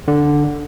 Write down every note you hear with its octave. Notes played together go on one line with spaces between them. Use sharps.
D3